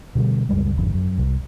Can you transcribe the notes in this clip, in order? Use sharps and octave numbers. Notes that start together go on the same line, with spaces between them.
B2 D3 F#3 G3
C#2 F#2 G3 G#3
G#1 F2 D3
F#2
C2